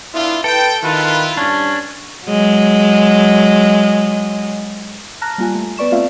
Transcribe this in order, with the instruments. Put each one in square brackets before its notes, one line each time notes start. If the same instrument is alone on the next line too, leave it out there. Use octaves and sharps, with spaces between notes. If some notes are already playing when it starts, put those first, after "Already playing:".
[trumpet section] B3 D4 F4 [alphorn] E4
[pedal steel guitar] A4 [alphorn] B4 [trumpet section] G5
[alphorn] D#3 [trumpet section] E4 F4 [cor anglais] B4
[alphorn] G2 [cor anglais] C#4 [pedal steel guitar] D4
[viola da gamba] F#3 G#3
[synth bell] A5 A#5 F6 F#6 A#6
G3 A#3 F4 G#5
A3
B3 B4 D5 C#6 E7
A3 C4 F4 D5 E5 F5